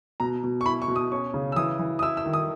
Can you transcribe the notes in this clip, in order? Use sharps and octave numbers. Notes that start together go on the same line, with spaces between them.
B2 A#5
B2
C#6
E4 B5
C#6
B2
D#6
C#4 C#6
C#3
E6
E3 D#6
E3
D#6
E4 E6
E6
D#3
D#6